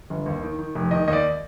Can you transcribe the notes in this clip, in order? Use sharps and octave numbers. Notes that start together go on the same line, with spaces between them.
G1
D#2
D#3
D#3
F1
D#3 D#5
D#2 D#5
D5